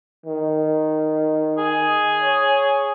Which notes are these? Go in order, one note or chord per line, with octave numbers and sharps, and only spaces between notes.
D#3
G#4
C#5